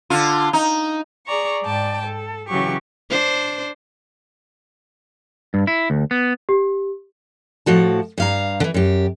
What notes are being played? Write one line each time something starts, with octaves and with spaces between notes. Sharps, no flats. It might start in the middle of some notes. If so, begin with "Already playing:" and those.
D3 F4
D#4
G#4 D5 A#5 C#6
G#2 D5 G5 A5
A4
C#3 E3 F#3 G4 C#6
D4 C5
G2
E4
D2
B3
G4
A2 F3 F#4 A5
G2 F5 A#5
D3 E3
F#2 G4